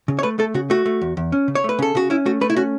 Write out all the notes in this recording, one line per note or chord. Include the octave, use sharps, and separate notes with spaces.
C#3
C#5
A3 B4
A3 A4
C#3 F#4
A3 F#4
A3
E2
E2
C#4
C#3
C#5
A3 B4
C#3 A4
C#3 F#4
C#4 E4
A3 F#4
A3 B4
E4
C#4 F#4